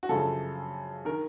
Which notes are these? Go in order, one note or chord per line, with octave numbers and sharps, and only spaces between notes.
F#4
F#2 C#3 F3 A4
D#3 A#4